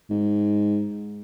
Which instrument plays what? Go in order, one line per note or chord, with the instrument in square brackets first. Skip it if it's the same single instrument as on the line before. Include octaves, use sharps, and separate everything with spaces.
[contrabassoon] G#2